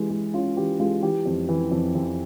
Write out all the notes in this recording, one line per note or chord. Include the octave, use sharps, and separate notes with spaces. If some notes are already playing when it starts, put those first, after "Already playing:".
Already playing: E3 G#3 G4
G#3
C#4 F4
E3 G4
G#3 F4
E3 G4
F2
E3
F2
F2